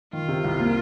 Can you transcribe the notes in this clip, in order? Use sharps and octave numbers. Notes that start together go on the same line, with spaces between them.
D#3 F4
C3
C2
A#3